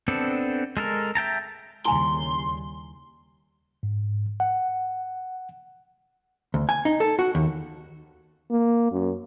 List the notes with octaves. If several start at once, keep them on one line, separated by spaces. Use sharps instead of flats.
B3 C4 D4 A4
G#3 A4 A#4
E5 G5 A5 A#5
D#2 C#3 G3 E4 G#5 C6
G#2
F#5
D2
G#5
D#4
A4
F#4
D#2
A#3
F#2